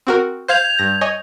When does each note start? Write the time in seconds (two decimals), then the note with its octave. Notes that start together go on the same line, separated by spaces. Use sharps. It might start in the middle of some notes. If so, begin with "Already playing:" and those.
0.07 C4 F#4 A#4
0.48 C5 F5 G6 G#6 C7 F7
0.79 G2 A#6
1.01 C#5 D#5 G#5